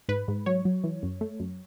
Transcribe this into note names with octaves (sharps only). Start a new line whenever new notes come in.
G#2 B4
G#2
F#3 C#5
F#3
E3
F#2
A3
F#2